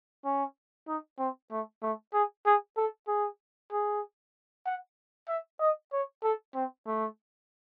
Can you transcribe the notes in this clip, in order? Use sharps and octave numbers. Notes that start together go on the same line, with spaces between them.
C#4
D#4
C4
A3
A3
G#4
G#4
A4
G#4
G#4
F#5
E5
D#5
C#5
A4
C4
A3